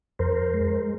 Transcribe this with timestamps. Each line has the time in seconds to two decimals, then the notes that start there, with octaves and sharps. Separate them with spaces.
0.19 F2 A#4 C5
0.54 G#3